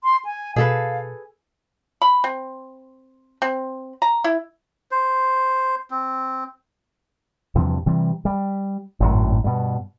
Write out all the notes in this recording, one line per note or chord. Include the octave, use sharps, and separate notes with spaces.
C6
G#5
B2 G#4 A4 B4 F5
B5
C4
C4
A#5
E4
C5
C4
E2 G2 C3 F3
C3 E3 G3
G3
G#1 F#2 A2
G2 B2